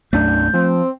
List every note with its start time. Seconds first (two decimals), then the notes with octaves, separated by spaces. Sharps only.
0.13 B1 F#2 A3 D4 G6
0.54 F3 C4